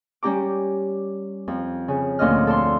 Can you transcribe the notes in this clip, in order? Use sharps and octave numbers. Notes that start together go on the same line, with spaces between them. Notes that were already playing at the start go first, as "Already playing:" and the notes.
G3 C#4 G4 A#5 D6
F2
C#3
D2 A#2 F3 C#4 D#5 F6
A4 D5 A5 C6